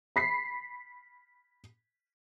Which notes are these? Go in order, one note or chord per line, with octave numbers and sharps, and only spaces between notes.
B5 B6 C7